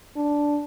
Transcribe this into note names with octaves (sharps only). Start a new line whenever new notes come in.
D4